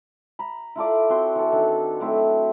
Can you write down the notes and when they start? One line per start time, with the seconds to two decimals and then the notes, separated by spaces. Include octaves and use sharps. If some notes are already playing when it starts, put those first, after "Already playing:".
0.39 A#5 B5
0.76 E4 F4 A4 D5
1.10 C4 F#4 C6
1.35 E3 A4
1.52 D#3 D4
2.00 F#3 A3 C4 E4